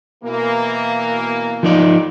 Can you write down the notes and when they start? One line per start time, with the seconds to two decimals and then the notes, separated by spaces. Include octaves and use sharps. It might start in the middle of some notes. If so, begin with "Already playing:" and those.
0.24 B2 E3 A#3
1.63 F3 D#4 D5